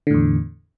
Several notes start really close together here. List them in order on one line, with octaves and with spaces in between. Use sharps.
D3 A2 E2